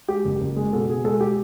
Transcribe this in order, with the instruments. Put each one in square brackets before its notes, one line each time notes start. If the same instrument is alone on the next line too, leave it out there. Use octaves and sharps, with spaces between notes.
[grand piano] G#3 G4
F#1
F#1
G#3
B2 A4
B2 G#4
G#3 A4
G#3 G4